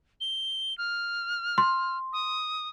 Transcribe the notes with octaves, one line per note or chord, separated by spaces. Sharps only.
G7
F6
C6
D#6